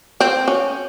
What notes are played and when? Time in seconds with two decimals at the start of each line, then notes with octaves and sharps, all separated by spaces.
0.21 C4
0.48 C#4